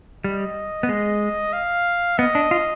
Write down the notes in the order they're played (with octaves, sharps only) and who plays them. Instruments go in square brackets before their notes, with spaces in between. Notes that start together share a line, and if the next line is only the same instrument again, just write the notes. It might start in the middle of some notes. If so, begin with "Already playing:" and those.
[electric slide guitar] G3 [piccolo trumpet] D#5
[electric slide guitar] B3
G#3
[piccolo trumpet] F5
[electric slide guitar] B3 [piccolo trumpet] D#5
[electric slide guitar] D4
F4